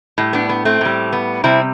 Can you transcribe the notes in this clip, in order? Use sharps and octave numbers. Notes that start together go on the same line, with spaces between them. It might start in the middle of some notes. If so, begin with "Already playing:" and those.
A2 G3
B3 D4
B3
A3 C4
A2 G3
B3
C3 G3 C4 E4